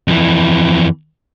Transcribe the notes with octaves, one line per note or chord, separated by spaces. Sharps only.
F2 E3